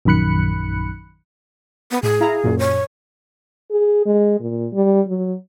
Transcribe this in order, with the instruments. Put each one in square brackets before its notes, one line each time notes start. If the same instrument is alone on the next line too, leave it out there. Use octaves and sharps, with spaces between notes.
[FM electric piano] A#1 F#2 D#3 B5 F#6 C#7
[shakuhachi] B3
[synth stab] A2 [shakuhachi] G#4
[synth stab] E4 F5 A#5
F#2 A#2
[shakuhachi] C#5
[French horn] G#4
G#3
A#2
G3
F#3